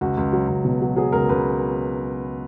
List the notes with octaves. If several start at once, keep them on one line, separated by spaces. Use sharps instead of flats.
C#2 F#4
C#2
F#3
C#2
B2
F#3
F#3 G#4
C#2 A#4
C#2 B4